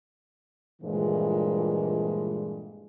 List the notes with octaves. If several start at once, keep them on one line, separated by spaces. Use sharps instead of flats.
G2 A#2 D3 E3 F3 G#3